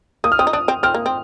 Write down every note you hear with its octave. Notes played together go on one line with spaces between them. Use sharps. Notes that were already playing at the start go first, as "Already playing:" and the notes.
A#3 D#6
F6
C4 D#6
D#4
D4 D#6
C4
C4 F6
A#3
C4